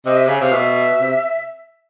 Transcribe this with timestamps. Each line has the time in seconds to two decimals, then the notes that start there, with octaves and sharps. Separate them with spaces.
0.06 C3 D#5
0.17 E5
0.27 C#3 F5
0.41 C3 F5
0.52 B2 E5
1.01 C3